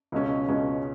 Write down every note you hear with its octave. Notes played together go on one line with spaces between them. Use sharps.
C#2 B2 G#3 C#4
C#2 B2 G#3 C#4